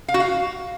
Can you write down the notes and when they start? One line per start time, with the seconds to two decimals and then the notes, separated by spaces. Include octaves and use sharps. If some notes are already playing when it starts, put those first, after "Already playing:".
0.08 F5
0.14 F#4
0.20 F5